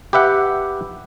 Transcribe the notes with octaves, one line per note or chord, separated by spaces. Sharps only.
G4 B4 E5 F#5